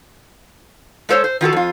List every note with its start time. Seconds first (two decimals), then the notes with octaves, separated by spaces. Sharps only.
1.09 G#3 A3 A4 C5 C#5
1.24 C5
1.41 D#3 F4 F#4 A4
1.53 F2 F4